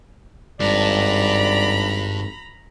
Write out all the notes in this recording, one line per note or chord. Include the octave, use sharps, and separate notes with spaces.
G#1 G2 D5 A#5 B5